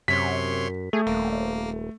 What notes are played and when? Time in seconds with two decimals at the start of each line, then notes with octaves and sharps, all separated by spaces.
0.08 F#2 C3 C#5 C6 B6
0.93 A3 G#4
1.07 D#1 A#3